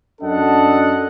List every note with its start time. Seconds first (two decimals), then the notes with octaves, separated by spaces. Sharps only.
0.22 F#2 D4 A4 D#5 F#5 A5